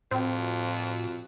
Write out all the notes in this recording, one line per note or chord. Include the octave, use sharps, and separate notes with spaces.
F2 A2 C4 F4 F#4